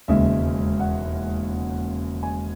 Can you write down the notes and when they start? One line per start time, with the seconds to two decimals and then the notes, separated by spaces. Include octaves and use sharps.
0.08 E1 D#2 C#3 G#3 E5
0.80 F#5
2.23 G#5